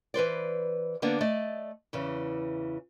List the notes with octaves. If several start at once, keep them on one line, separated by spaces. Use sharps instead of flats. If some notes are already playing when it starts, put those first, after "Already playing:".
E3 B4 C5 D5
D3 A#3 B3 D4
A3 D5 D#5
E2 C#3 E3